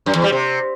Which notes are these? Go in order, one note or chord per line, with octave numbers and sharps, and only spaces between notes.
F#2
E2
G3
C3